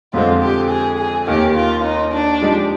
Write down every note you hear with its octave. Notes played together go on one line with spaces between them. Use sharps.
F2 D3 F3 G#3 C4 F4
G4
G#4
G#4
D#2 D#3 A#3 G4
F4
D#4
D4
F3 G#3 D#4 G4